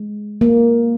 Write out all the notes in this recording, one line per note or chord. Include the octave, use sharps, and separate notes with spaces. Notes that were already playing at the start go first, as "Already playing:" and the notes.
Already playing: G#3
A#3